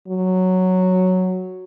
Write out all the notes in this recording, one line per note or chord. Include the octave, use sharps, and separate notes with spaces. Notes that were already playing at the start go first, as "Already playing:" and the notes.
F#3